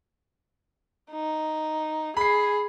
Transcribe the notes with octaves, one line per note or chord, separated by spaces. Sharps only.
D#4
G#4 B5 C7